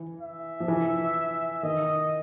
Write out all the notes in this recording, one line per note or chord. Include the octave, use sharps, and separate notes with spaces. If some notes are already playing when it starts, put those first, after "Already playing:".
Already playing: E3
E5
F3
E3
D#3 D#5